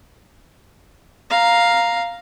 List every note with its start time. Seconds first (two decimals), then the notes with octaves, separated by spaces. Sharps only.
1.30 F5 A#5